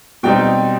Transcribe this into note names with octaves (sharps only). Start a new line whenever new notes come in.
B2 G3 C4 D#4 G5